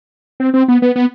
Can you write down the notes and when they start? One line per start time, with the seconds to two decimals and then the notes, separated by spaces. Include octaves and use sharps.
0.40 C4
0.54 C4
0.68 B3
0.82 B3
0.96 B3